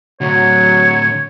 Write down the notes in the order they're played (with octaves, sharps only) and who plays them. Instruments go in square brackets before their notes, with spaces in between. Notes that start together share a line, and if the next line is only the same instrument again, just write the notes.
[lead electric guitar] A2 D3 [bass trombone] F#3 [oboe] C#5